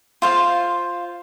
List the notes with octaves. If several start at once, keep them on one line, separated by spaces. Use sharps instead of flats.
F4 C5 F5